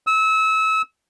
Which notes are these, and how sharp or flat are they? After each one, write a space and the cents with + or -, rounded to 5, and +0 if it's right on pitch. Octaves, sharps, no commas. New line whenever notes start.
E6 -30